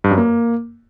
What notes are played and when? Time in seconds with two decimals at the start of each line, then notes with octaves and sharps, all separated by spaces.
0.04 G2
0.11 F#2
0.18 A#3